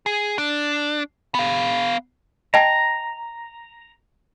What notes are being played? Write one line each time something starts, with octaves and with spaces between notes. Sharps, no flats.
G#4
D4
B3 F5
D#5 G5 A5 A#5